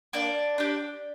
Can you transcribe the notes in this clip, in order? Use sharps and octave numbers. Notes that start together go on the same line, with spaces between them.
A#3 D4 D5
D4 G4